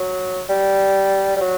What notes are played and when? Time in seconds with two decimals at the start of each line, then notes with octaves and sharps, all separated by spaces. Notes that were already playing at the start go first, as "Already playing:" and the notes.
Already playing: F#3
0.49 G3
1.36 G3
1.41 F#3